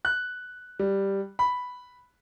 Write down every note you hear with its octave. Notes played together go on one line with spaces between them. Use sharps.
F#6
G3
B5